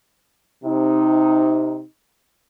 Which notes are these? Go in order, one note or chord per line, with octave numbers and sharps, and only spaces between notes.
C3 D#4